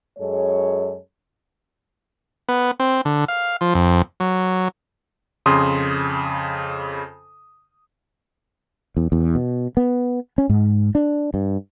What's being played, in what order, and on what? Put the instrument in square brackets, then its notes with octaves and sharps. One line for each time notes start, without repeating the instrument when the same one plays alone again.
[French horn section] F#2 G#3 G#4 A4 C#5
[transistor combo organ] B3
C4
D3
F5
F3
F2
F#3
[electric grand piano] F2 C#3 C6 D#6
[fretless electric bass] E2
E2
B2
B3
C#4
G#2
D4
G2